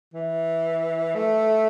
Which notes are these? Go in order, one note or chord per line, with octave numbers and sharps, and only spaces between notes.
E3
A3